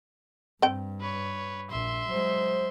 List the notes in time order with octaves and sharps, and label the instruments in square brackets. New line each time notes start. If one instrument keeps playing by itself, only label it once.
[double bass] G2 [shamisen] C4 G5
[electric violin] B4 C#5
[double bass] A#1 [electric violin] E5 C6
[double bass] F#3 G#3 [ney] C5